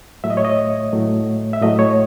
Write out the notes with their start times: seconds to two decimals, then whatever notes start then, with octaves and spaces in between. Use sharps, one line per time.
0.24 A2 F#3 A3 E5
0.30 D#5
0.37 C#5
0.45 D#5
0.92 A2 F#3 A3
1.53 E5
1.61 A2 F#3 A3 D#5
1.79 C#5